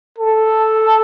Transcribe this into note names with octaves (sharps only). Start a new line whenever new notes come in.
A4